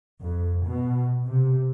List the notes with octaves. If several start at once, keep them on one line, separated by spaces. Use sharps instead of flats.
F2
B2
C3